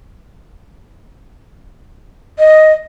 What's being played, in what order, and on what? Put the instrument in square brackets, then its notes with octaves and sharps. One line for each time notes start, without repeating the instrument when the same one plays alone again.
[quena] D#5